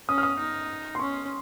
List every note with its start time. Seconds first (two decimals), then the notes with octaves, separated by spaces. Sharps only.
0.08 C#4 D#6
0.18 F6
0.23 D#6
0.39 D#4
0.95 C6
1.00 C#4 C#6